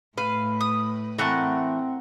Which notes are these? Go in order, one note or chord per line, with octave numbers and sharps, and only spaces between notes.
A2 B4 F5
D#6
E3 A3 C4 A#4 F#5